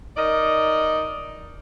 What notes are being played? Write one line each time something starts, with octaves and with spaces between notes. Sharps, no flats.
D#4 A#4 D5 D#5